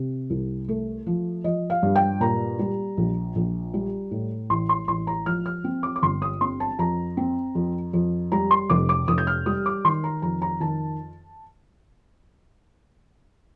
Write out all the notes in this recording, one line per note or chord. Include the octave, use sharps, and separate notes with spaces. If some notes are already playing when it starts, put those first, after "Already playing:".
Already playing: C3
C2
A3
F3
F3 D#5
F5
G2
G5
A#2 A#5
G3
A#1
A#1
G3
A2
A1 C6
C6
A1 C6
A#5
F3 F6
F6
C4
D6
D6
G1 C6
D#6
C4 C6
A5
F2 A#5
C4
F2
F2
G3 A#5
C6
F1 D6
D6
F1 D#6
G6
F6
G3 D#6
D6
D#3 C6
A#5
F2 A#5
A#5
D#3 A5